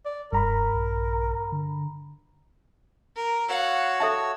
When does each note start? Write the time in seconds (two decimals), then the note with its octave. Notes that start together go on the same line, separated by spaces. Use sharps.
0.05 D5
0.32 F1 G2 A#4 A#5 B5
0.75 A#1
1.52 D3
3.16 A#4
3.49 F#4 C#5 F5 F#5 E6
4.00 A4 E5 A5